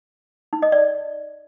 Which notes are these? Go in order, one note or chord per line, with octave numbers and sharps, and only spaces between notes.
D#4
D#5
D5